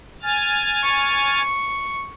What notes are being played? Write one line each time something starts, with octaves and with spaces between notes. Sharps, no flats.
G#5 F6 A6
C#6